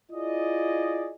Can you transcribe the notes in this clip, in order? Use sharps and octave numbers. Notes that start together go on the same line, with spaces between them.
E4 F4 G#4 D5 D#5